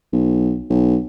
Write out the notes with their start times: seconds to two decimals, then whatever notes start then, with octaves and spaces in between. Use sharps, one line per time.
0.13 B1
0.70 B1